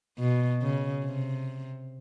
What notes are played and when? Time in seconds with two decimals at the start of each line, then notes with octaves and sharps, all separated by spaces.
0.19 B2
0.62 C#3
1.05 C3